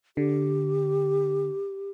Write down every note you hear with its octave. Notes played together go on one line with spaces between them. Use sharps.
D3 G4